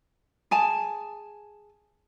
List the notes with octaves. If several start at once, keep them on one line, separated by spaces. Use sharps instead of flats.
G#4 G#5 A5